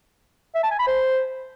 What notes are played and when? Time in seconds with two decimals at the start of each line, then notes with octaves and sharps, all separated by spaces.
0.55 E5
0.63 A5
0.71 G#5
0.79 B5
0.87 C5